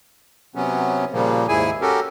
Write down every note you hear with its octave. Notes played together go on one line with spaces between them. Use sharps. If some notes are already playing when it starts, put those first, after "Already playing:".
C3 F#3 B3 C#4
A#2 C#3 F3 G3 A#3
D#2 G#2 E4 G#4 G#5
C#4 F#4 G4 A4 A#4